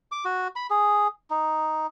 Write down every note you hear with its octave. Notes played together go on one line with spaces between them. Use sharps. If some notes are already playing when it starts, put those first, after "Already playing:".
D6
F#4
B5
G#4
D#4